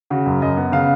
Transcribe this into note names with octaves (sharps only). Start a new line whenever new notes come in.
C#3 F#4
F#2
F#2 D#5
B3
C#3 F5